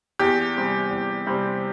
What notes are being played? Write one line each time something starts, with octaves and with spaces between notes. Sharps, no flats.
E2 G4
C3 G3 C4
E2
C3 G3 C4